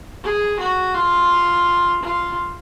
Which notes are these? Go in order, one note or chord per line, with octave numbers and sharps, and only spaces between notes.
G#4
F#4
F4
F4